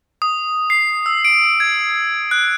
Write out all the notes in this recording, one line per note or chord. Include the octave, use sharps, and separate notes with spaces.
D#6
C7
E6
D7
G#6
F#6